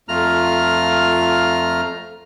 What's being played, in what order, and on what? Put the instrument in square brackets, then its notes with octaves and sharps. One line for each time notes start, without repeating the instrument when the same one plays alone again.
[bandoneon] F2 A3 F4 A#5 F6